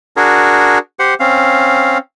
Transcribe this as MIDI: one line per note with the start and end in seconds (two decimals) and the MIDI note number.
0.17 0.78 62
0.17 0.78 66
0.17 0.78 68
0.17 0.78 70
0.99 1.14 67
0.99 1.14 72
0.99 1.14 78
1.20 1.98 60
1.20 1.98 61
1.20 1.98 77